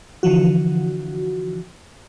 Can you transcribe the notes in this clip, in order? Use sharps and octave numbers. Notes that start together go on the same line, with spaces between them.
D3 E3 F3 F#4